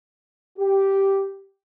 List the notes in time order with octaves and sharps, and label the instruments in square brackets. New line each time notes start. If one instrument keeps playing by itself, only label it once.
[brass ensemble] G4